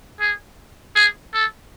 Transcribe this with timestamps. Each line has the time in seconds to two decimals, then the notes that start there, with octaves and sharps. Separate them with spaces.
0.20 G#4
0.95 G#4
1.33 A4